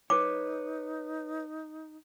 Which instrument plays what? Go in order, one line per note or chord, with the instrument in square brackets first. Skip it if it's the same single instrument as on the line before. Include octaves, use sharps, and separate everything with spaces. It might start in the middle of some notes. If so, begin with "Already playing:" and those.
[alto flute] D#4 [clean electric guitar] B4 C#5 [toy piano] D6